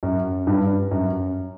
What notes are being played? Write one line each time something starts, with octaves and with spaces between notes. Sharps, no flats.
F#2
G2
F#2